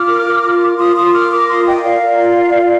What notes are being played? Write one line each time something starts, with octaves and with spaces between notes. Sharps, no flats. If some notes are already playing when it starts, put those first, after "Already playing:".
Already playing: F4 D6 F6
A#4
A#4
F4
A#4
F4 C6 D#6
F4 C6 D#6
A#4 D6 F6
A#4 D6 F6
F4 C6 D#6
A#4 D#5 G5
A#4 D5 F5
A#4
F4
A#4
F4